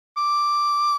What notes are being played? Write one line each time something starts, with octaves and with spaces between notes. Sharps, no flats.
D6